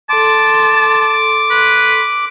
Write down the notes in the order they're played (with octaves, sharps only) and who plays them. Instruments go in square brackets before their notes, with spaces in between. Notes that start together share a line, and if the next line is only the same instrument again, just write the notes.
[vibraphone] A4 C6 [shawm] A5 [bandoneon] D6
[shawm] B4